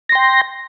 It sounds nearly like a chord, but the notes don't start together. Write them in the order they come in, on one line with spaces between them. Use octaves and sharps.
A#6 C6 G5